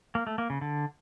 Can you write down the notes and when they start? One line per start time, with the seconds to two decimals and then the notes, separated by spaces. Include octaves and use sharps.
0.15 A#3
0.27 A3
0.38 A#3
0.50 C#3
0.61 D3